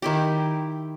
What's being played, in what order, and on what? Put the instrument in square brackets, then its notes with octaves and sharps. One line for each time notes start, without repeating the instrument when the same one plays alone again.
[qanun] D#3 E4 G4